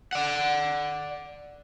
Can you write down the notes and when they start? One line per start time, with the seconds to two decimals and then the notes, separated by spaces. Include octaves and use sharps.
0.13 D5 F#5